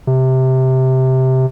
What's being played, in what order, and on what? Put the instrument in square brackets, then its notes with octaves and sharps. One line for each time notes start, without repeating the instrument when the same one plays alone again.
[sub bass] C3